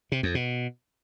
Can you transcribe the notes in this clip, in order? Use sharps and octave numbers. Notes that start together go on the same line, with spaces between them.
C3
F2
B2